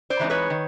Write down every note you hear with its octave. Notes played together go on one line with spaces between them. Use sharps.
C5 D5
E3 G#3 C4 D#4
B4 C#5
D#3